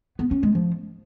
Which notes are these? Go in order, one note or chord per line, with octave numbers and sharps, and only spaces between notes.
B3
C#4
G#3
F3